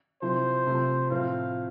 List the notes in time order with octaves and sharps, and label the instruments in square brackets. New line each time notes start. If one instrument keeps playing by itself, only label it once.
[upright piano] C3 F3 C4 E4 [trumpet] C5
[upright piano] C3 F3 A3
[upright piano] A2 F3 C4 E4 [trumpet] F5